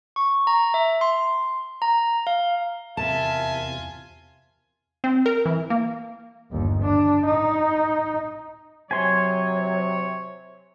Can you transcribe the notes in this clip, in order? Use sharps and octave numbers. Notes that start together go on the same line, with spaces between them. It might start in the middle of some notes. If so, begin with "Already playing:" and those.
C#6
A#5
E5
C6
A#5
F5
E2 C3 F4 A#4 E5 G#5 A5
C4
A#4
E3
A#3
G1 D#2
D4
D#4
C3 F#3 C#5 G#5 C6